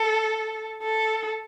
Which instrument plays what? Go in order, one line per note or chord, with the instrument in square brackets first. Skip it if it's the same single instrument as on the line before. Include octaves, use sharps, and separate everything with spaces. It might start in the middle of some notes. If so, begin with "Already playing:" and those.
Already playing: [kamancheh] A4
A4